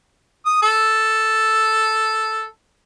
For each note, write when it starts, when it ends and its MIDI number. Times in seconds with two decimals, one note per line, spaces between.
0.46 0.58 87
0.63 2.45 69